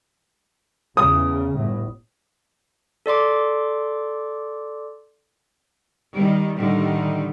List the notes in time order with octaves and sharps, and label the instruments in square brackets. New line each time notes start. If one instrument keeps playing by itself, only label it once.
[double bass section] E2 C#3 [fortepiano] D#6
[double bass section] G1 A2
[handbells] A4 D5 C6 D6
[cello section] D#3 G3
A2 D3 D#3 G3